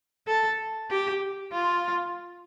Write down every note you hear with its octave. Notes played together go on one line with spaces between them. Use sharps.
A4
G4
F4